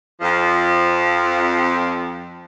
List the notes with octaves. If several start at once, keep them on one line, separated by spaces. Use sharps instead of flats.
F2 F3